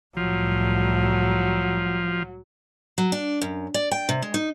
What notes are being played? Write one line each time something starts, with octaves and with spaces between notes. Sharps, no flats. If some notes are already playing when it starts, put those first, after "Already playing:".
C2 A2 F3 F#3
F#3
D4
F#2
D5
G5
C3
G#3
D#4